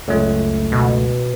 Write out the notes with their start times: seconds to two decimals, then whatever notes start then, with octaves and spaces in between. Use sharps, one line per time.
0.08 C#2 F#2 A3
0.72 B2